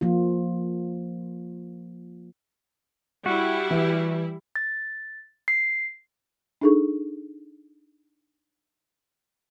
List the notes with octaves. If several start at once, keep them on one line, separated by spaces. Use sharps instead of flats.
F3 A#3 F4
G3 E4 F#4
E3
A6
C7
D4 D#4 G#4 A4 C#6